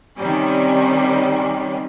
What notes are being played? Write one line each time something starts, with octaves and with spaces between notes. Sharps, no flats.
C3 D#3 G3 C#4